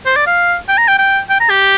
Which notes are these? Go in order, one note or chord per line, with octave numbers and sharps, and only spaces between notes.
C5
D5
F5
G5
A#5
G5
G5
G5
A#5
G4